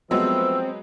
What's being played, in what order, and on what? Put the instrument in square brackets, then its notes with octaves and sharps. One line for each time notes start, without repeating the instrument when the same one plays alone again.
[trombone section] F3 A3 B4 [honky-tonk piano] F#3 G#3 B3 [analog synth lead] C4 [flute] E6